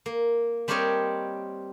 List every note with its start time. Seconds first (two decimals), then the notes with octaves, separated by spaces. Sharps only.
0.06 A#3
0.68 G3 C4 G4 A#4 C#5 D#5